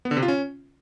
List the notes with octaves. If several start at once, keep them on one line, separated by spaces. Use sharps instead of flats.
B3
D3
C3
F4
C#4